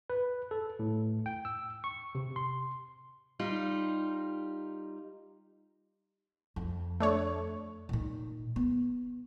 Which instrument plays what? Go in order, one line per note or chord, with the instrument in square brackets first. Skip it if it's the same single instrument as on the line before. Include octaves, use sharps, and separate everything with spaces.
[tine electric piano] B4
A4
A2
G5
E6
C#6
C3
C6
[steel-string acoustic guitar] G3 D#4 F4
[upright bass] F2
[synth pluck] A3 D4 C#5
[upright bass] A#2 D#3
B3